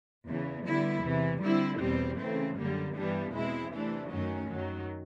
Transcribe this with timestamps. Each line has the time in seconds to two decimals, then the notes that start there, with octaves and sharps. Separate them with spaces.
0.26 E2 C#3 E3
0.64 D3 G3 B3 E4
1.02 E2 C3 E3
1.41 D3 G3 C4 E4
1.80 E2 B2 G3 C4
2.18 C#3 E3 A3 C4
2.57 F#2 D3 G3 A#3
2.95 G2 E3 G3 B3 D4
3.33 E2 B2 G#3 C4 E4
3.72 C3 E3 A3 D4
4.10 F#2 D#3 F#3 A3 C#4
4.49 F#2 D#3 F#3